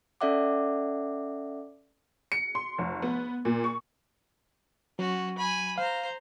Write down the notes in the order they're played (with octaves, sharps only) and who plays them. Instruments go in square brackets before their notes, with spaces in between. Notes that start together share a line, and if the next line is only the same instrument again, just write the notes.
[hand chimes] C#4 A4 D5 E5 F#5 D6
[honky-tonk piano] C#7
C6
F1
B3
A#2
C#6
[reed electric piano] F#3 [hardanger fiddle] C#4 F#4
[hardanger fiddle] G#5 B5
[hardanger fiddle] C5 A#5 [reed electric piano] F5